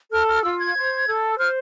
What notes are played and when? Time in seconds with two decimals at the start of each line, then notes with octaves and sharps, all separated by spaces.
0.11 A4 F6
0.28 F6
0.43 F4 E6
0.59 G#6
0.76 C5
1.07 A4
1.38 C5 F6